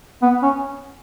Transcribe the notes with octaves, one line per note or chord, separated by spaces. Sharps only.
B3
C#4